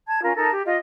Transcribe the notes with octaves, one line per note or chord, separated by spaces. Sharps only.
A5 G#6
C#4 F4 A#4
D#4 A4 A#4 A5
G4
F4 D#5